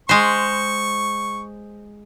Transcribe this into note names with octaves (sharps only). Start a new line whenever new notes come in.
G#3 C5 C#6